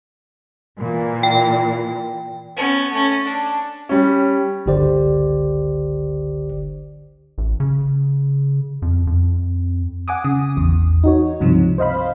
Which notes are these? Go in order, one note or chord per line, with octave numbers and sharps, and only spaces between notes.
A#2 E3
G5
B3 C#4
A3 C#4
D4
G3 C#4
G1 C#2 D3 G4 C5 D5
A1
C#3
F2
F2
F#5 G#5 D6 D#6
C#3 D#6
A1 E2
D#4 F#4 C#5
C#2 G2 C3 F3
C5 D#5 F5 B5